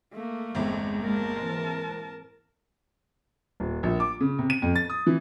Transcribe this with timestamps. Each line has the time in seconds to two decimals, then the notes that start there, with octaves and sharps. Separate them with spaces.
0.14 A3 A#3
0.55 G1 E2 G#3 C4
1.02 G#3 A#3 A#4 A5
1.36 G#2 E3 G#3 C4
3.60 D#1
3.83 A#1
4.00 D6
4.20 C#3
4.39 C3
4.50 D#7
4.62 F2
4.76 A6
4.90 D#6
5.07 E3